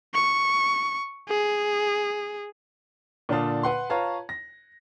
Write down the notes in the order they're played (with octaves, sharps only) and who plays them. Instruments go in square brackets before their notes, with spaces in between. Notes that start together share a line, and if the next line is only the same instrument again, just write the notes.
[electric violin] C#6
G#4
[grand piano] A#2 D3 D4 F5 A5 D#6
B4 F#5 C6
F4 B4 C#5 F5 A5 A#5
A#6